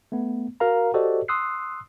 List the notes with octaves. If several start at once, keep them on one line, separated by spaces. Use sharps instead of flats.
A3 B3
F#4 A#4 F5 A#5
F#4 G4 A4 C5 D5 D#5
C6 D#6 E6 F#6 C7